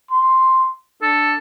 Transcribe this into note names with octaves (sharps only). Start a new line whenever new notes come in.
C6
D4 A4